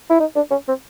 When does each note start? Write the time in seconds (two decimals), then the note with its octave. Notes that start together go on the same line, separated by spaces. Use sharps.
0.10 E4
0.20 D#4
0.36 D4
0.51 C#4
0.68 C4